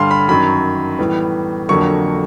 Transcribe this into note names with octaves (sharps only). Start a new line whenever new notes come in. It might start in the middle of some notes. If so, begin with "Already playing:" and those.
Already playing: G2 D3 G3 F5 C6
B5
F#2 D#3 F#3 B5
A2 E3 G3 B3
F2 D3 F#3 A#3 C#6